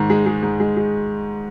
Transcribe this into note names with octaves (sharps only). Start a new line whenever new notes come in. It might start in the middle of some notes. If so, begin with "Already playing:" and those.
Already playing: G#2 D#3
G#3
G#3
G#2
G#3
G#3